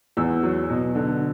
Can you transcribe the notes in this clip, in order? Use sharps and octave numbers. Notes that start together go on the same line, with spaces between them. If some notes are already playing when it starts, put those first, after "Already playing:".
E2 E6
F#3
B2
D3